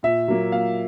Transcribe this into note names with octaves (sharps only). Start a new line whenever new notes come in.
A#2 E5
F#3 A#3
A#2 F5